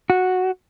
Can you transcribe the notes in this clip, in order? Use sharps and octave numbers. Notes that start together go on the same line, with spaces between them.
F#4